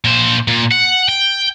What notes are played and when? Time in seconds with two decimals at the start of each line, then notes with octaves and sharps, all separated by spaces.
0.04 A#2 C5
0.48 A#2
0.72 F#5
1.09 G5